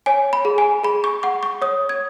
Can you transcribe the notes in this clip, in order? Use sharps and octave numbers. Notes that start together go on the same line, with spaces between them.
C#5 G#5
B5
G#4
G#5
G#4 B5
C#6
F#5 C#6
C#6
C#5 D#6
G#6